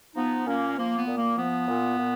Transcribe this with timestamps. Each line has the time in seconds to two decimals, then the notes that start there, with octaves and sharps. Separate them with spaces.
0.16 F3 B3 D#4
0.46 A#2 A#3 C#4
0.78 F3 A#3
0.97 B3
1.07 A#2
1.17 A#3
1.37 F3 B3
1.68 A#2
1.98 A#2